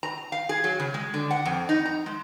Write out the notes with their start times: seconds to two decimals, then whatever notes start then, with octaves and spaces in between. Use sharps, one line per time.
0.03 A#5
0.32 F5
0.49 G#4
0.64 F#3
0.80 C#3
0.94 G#3
1.14 D3
1.31 F#5
1.45 F2
1.69 D#4
1.85 A#5
2.06 G#3